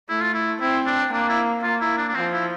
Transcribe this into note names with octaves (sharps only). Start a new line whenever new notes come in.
A3 E4
F4
E4
C4 E4
D4
A#3 D4
E4
A#3 F4
E4
D4
D4
F3 C4
E4